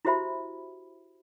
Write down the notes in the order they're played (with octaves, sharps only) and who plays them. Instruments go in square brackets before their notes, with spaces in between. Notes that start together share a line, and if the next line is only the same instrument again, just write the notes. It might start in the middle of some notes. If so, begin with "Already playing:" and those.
[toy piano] E4 F#4 G4 C5 E5 B5